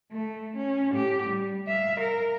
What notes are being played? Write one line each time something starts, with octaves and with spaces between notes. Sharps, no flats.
A3
C#4
A2 G4
G3
E5 F5
A#4